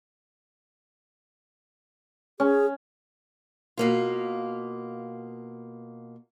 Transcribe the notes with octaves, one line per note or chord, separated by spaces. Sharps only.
C#4 G#4
B2 A#3 F4